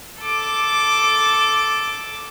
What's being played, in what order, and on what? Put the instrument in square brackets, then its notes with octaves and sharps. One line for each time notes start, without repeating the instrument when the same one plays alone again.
[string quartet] A4 D6